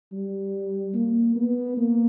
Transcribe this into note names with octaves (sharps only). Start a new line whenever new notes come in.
G3
A#3
B3
A#3